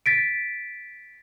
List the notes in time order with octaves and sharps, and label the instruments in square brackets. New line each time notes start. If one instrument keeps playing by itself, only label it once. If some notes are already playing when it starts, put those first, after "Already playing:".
[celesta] A6 B6 D7